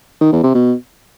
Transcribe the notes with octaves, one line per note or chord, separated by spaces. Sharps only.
D#3
E2
C3
B2